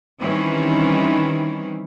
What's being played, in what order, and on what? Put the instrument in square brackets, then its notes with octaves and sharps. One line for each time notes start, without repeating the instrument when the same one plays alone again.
[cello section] D#3 E3 G3 C4 C#4 E4